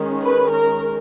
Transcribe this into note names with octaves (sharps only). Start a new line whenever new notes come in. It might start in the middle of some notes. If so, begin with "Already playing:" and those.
Already playing: D#3 G#3 C#4
B4
A#4